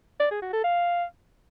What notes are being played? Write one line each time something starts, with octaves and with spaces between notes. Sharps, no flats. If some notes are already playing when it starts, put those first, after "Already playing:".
D5
G#4
F#4
A4
F5